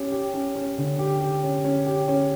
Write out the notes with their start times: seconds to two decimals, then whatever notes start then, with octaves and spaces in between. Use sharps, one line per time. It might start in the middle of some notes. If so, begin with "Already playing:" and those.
Already playing: C#4 G4
0.12 G4
0.34 C#4
0.55 C#4
0.78 D3
0.99 G4
1.20 G4
1.43 C#4
1.64 C#4
1.86 G4
2.08 C#4